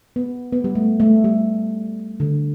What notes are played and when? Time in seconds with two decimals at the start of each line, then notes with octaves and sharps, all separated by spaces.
0.16 B3
0.53 B3
0.64 G3
0.75 A3
1.00 A3
1.24 G3
2.20 D3